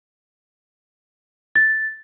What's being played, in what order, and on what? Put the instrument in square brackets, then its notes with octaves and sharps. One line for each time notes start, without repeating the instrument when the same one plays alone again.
[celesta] A6